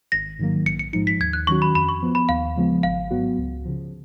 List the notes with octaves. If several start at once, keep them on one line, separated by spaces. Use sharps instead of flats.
G#1 A#6
G#2 D#3 F#3 A#3
A#1 C#7
C#7
G#2 F3 G#3 D#4 C#7
B6
D#2 G#6
F#6
D#3 F#3 C#4 F#4 C#6
B5
F2 B5
C#6
F3 B3
B5
D#2 F5
C#3 F3 G#3 B3
G#1 F5
G#2 F#3 B3 F#4
C#2
C#3 F3